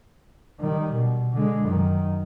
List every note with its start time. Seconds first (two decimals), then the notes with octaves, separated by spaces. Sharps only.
0.60 D#3 G3
0.92 B2
1.33 D3 G#3
1.64 F#2 D#3